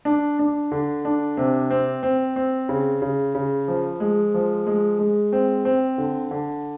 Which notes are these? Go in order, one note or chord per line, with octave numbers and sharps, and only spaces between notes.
D4
D4
D3
D4
C3
C4
C4
C4
C#3
C#3
C#3
F3
G#3
F3
G#3
G#3
C4
C4
D3
D3